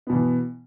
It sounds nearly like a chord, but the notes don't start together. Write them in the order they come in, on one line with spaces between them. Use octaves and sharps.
B3 B2 E3